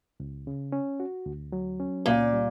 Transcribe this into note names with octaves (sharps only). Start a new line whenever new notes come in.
C#2
C#3
C#4
F#4
D2
F#3
C#4
C#2 A#2
G3